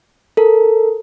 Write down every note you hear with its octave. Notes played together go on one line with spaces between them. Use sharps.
A4 A#4